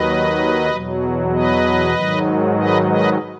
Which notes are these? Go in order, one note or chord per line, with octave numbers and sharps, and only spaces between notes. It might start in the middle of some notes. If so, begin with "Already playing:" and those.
Already playing: D#2 D#3 F#3 B4 D#5
E2 B2 F#3
B4 D#5
G#2 D#3 F#3
B4 D#5
B4 D#5